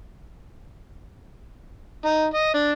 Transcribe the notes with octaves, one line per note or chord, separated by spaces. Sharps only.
D#4
D#5
D4